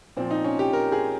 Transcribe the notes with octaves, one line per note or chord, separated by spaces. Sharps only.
A#2 F3 C4
D#4
C#4
G4
A#4
G#4